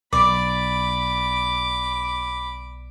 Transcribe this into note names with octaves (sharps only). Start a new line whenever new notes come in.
B1 D5 B5 D6